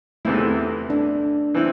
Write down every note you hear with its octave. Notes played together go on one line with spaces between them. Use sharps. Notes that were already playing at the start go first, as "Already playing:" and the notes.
E2 C3 E3 A3 C4 E4
D4
E3 C4 E4